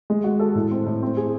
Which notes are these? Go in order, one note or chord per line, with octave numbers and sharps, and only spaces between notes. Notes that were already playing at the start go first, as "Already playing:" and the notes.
G#3
F#4
A4
A2
C4
A2
C4
G#4